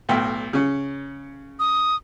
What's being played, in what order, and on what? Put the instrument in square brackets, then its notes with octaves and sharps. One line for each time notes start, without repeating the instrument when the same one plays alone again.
[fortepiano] B1 A2 G5
C#3 C#4
[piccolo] D#6